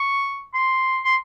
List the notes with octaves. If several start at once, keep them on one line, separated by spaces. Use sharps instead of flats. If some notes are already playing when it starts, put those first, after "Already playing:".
Already playing: C#6
C6
C6